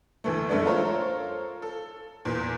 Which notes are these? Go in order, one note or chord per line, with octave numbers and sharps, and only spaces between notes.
D2 E3 A3
F#2 G#3 A3 B3 D4
F4 A4 A#4 C5 C#5
A4
E2 A#2